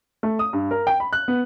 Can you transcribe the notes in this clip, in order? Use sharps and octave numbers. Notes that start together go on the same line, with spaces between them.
A3
D#6
G2
A#4
G5
B5
F#6
B3